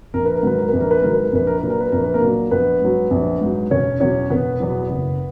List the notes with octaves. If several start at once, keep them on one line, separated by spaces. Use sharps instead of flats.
A#1 A#4
B4
A#4
G#2 D#3 F#3 B4
A#4
A#1 B4
A#4
B4
G#2 D#3 F#3 A#4
B4
A#4
A#1 B4
A#4
A#2 F#3 B4
A#4
B4
A#1 A#4
B4
A#3 A#4
A#2 F#3
A#1 B3 B4
G#2 F#3
A#1
G#2 F#3
E1 C#4 C#5
E2 B2 F#3 C#4 C#5
E1 B3 B4
E2 B2 F#3
F#1